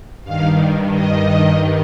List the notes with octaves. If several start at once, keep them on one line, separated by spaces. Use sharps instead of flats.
G2 D#3 F5
D#5